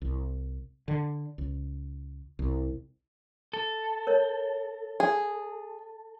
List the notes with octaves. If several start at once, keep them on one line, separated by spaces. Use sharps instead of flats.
C2
D3
C#2
C2
A4
A#4 C#5
G#4